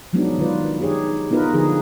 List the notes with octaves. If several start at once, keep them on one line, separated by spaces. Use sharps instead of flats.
F3 F#3 G#3 B3 D4 D#4
D#3 F4 B4 D5
D#4 G4 G#4 C#5
B3 D#4 F4 A#4 B4
D3 F3 G#4